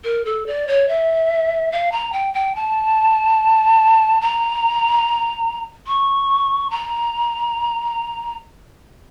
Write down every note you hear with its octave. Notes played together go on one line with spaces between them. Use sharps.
A#4
A4
D5
C#5
E5
F5
A#5
G5
G5
A5
A#5
C#6
A#5